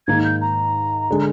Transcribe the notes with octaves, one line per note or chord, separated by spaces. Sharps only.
G#2 D#3 A#3 G#6
G6
A#5
D3 G#3